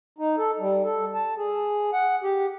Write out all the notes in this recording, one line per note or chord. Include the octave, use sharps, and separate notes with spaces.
D#4
A4
G3
A4
A5
G#4
F#5
G4